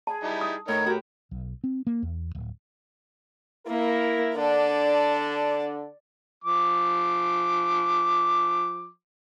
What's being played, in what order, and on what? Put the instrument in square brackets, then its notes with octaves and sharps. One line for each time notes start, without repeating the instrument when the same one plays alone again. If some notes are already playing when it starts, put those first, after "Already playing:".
[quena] G#4 [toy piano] A5
[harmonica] G3 D#4 E4
[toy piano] D#6
[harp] A2 [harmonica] D#4 A#4 C#5 [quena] G#6
[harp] F#4 G4 [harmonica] A#4
[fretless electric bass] B1
C4
A#3
E2
D1
[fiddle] A#3 [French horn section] E4 A#4
[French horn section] D3 D4 [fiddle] D5
[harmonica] F3 D6